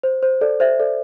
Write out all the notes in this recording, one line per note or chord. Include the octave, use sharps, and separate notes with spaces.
C5
C5
A4 D5
C5 E5
A4 D5